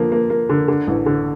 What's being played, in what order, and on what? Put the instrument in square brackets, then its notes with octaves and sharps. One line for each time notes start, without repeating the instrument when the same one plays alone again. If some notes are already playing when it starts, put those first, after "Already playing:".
Already playing: [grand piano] D3 F3 A#3
A#3
A#3
D3
D3
A1
D3